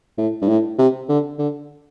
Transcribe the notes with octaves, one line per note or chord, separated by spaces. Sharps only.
A2
G2
A2
C3
D3
D3